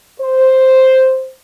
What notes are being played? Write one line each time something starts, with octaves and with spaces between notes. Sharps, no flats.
C5